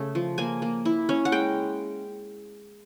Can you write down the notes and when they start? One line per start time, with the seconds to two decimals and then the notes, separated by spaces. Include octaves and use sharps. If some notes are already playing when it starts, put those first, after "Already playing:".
Already playing: C#3 A3
0.15 F3
0.38 A#3 G#5
0.62 A#3
0.85 E4
1.09 C#4
1.25 F#5
1.32 G#3 G5